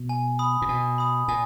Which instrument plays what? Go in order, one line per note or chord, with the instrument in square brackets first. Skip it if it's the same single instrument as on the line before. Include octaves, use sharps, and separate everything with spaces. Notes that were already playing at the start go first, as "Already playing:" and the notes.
Already playing: [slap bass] B2
[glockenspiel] G#5
B5 D#6
[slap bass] A#2
[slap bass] B2 [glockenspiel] G#5
[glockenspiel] B5 D#6
[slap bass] A#2 [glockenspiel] G#5